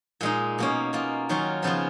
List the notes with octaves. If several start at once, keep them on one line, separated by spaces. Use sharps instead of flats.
A#2 G#3 D#4
B2 A#3 C#4
B2 A#3 F4
D#3 F#3 C#4 F4
C#3 F3 B3 F4